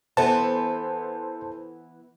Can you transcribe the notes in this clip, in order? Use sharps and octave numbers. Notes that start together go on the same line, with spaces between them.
E3 B3 A4 C5 A5